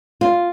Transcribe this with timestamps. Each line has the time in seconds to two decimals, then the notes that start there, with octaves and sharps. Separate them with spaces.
0.21 F4